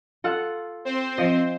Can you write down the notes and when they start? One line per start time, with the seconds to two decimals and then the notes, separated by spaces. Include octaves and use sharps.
0.24 F4 A4 F#5
0.85 C4 C5
1.18 F3 D#5